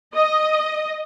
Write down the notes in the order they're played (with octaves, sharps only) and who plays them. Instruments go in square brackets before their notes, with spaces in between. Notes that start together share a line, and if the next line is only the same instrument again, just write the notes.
[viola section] D#5